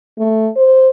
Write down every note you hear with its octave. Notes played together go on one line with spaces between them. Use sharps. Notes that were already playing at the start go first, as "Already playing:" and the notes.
A3
C5